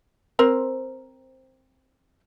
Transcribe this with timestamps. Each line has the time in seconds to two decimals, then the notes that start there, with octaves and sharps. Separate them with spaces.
0.39 C4 A#4 C5